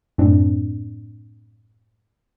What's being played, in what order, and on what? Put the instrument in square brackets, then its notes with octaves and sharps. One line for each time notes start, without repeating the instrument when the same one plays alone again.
[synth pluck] F#2 A2 C4 D4